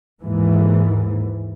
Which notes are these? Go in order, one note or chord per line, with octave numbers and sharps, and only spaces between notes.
D#2 G#2 E3